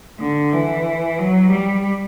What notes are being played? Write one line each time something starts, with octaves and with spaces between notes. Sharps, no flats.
D3
E3
F#3
G3